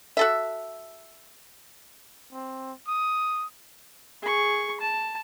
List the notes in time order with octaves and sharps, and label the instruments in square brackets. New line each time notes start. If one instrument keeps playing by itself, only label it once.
[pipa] F#4 A4 E5
[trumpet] C4
D#6
[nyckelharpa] G#4 C#6
A5